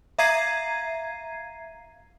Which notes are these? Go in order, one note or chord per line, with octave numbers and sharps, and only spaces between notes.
E5 F5 A#5 G#6 C7 D#7